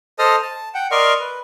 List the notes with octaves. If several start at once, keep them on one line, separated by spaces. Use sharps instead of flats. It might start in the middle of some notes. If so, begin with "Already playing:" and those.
A4 C5 D#5 A5 D#6 F6
A5
F#5 G5
A#4 D5 D#5 C6 C#6 F6
B4